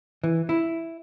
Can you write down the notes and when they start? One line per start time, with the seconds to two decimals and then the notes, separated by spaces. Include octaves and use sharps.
0.24 E3
0.49 E4